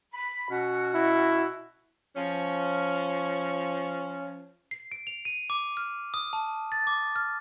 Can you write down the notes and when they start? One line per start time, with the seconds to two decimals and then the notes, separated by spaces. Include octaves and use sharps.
0.13 B5
0.50 B2 C#4 F#4
0.95 E4
2.16 F3 C#4
4.71 C7
4.92 D7
5.07 F7
5.25 D#7
5.50 D6
5.77 F6
6.14 D#6
6.33 A5
6.72 A6
6.87 D6
7.16 F6